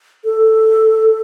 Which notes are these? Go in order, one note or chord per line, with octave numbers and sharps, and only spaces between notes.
A4